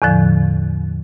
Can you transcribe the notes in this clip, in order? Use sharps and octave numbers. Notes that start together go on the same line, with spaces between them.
E2 A2 D3 F3